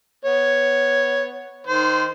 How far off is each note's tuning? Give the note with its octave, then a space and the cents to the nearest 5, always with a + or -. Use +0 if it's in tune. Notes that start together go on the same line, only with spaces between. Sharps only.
B3 +0 C#5 +0
D#3 +0 C5 -25 C6 -5